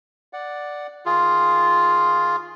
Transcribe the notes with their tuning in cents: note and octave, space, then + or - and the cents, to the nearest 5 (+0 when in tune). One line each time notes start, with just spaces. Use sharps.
D5 +0 F#5 +0
D#3 +10 F4 +0 G#4 +0